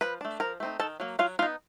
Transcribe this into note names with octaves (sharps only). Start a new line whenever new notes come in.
F3 B4 B5
A3 D4
F3 A#4 A#5
A3 C4 D#4
D#3 A4 A5
F#3 A#3
F#3 F4 F5
B3 D#4 F4 F5